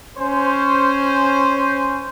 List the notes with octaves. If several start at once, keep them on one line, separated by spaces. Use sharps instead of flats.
C#4 C5